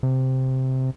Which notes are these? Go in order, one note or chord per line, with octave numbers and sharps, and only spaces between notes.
C3